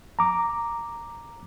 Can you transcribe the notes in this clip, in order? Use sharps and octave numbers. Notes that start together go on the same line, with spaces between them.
A#5 D6